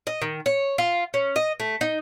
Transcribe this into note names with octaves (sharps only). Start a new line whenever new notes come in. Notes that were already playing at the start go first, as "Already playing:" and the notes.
D#5
D#3
C#5
F4
C#4
D#5
A3
D#4